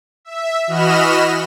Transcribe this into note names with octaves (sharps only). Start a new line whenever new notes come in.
E5
E3 F#4 D#5 B5 F6 E7